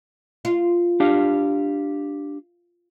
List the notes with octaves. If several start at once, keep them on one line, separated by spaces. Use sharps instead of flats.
F4
D4 G4 F5